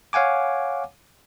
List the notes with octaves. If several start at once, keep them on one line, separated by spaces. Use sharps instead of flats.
C#5 F5 F#5 G#5 D6